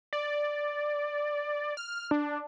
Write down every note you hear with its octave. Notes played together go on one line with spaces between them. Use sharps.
D5
F6
D4